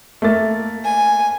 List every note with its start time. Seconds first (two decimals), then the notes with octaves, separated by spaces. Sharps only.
0.22 A3 A#3 A6
0.85 G#5